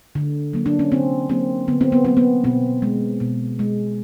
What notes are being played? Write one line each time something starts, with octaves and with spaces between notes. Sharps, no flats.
D3
F#3 A#3
D4
C#4
D3 C4
F#3 A#3 C4
D3 B3
C4
B3
F#3 A#3 C4
B3
B2 C4
G#3
B2
G#3